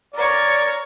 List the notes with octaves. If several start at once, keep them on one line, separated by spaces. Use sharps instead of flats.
A#4 C#5 D5